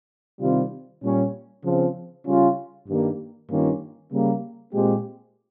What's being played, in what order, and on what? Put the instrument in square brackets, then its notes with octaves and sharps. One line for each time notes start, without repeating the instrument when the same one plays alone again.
[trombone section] C3 D#3 G3 C4 F4
A#2 G3 C#4
C#3 F3 C4
C#3 G3 C#4 F4
G2 D#3 G3 A#3
G2 D#3 A#3 C#4 F4
C#3 G3 A#3
A#2 G#3 C4 G4